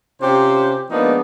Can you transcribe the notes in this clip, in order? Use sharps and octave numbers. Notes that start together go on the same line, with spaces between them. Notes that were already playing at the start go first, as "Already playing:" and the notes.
C3 C#4 F4 G4 C5
F3 G#3 A#3 B3 D4 D#4